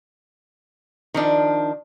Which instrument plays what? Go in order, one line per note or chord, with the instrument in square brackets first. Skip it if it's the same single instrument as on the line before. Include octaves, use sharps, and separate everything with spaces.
[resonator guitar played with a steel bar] D#3 F3 D4